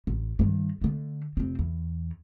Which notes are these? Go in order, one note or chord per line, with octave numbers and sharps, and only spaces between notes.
A1
G2 D#3
D3 A3
F1 C4
E2